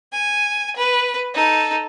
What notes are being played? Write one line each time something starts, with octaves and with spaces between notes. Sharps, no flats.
G#5
B4
D#4 A4